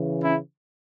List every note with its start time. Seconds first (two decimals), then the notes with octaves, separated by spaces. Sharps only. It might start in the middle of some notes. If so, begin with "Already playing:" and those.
Already playing: C#3 E3
0.22 C#4 E4